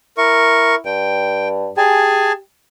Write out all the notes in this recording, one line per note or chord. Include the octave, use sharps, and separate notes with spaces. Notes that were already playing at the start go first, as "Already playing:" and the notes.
E4 A#4 C#6
G2 G5
G4 G#4 G#5 A5